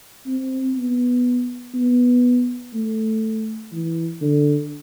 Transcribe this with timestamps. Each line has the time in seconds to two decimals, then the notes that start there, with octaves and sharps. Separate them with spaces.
0.27 C4
0.76 B3
1.75 B3
2.74 A3
3.73 E3
4.22 D3